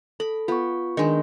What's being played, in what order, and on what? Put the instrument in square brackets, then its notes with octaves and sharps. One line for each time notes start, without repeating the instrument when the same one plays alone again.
[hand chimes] A4 [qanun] B5
[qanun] B3 [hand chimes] F4 C#6
[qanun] D#3 G#3 [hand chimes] D4 D#5